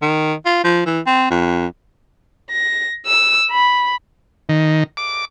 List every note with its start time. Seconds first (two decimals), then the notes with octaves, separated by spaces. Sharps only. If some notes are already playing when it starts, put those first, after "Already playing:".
0.02 D#3
0.46 F4
0.64 F3
0.86 E3
1.06 C4
1.31 F2
2.50 A#6
3.06 E6
3.51 B5
4.49 D#3
4.97 D6